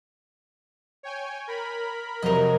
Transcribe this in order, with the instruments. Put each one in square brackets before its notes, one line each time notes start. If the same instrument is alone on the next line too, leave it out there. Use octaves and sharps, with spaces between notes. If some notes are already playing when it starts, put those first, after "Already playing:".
[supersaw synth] C#5 G5 G#5
A#4 B5
[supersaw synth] F2 C3 F#3 [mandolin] A#4 D#5